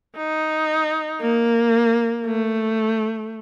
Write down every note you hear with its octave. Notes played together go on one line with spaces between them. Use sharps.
D#4
A#3
A3